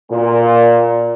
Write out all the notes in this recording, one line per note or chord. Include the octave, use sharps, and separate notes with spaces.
A#2